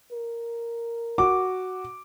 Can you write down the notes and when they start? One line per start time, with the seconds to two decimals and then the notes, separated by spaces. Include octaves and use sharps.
0.12 A#4
1.18 F#4 D6